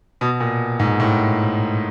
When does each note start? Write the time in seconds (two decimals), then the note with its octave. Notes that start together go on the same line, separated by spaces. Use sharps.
0.21 B2
0.40 A#2
0.79 G#2
1.00 A2